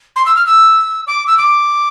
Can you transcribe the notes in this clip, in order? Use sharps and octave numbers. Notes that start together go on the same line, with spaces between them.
C6
E6
F6
E6
D6
E6
D6